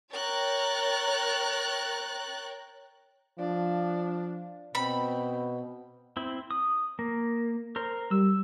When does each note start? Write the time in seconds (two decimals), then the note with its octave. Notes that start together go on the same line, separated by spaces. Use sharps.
0.13 A#4 C#5 G5 F#6 A6
3.39 F3 D4
4.75 B2 C4 B5
6.17 C4 E4
6.51 D#6
6.99 A#3
7.76 A#4 C5
8.11 G3 E6